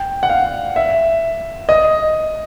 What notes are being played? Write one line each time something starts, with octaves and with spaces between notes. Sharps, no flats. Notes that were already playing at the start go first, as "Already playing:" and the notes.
Already playing: G5
F#5
F5
E5
D#5